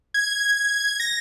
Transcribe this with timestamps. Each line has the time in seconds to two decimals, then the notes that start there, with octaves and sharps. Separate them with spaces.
0.14 G#6
1.00 A#6